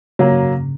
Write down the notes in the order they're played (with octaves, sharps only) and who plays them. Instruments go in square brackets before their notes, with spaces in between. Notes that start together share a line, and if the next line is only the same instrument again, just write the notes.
[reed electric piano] C#3 [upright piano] F#3 A#3